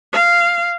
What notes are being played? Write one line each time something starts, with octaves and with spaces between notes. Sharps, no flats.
F5